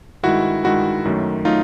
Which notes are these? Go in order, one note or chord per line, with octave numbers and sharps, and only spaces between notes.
G2 D#3 G#3 E4 F#4
G2 D#3 G#3 E4 F#4
F#2 D#3 F#3 A3
F#3 A3 D#4 F4